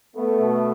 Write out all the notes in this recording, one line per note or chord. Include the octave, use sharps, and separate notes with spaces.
A3 B3
B2